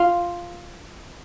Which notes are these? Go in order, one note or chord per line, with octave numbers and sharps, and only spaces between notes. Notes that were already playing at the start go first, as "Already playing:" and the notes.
Already playing: F4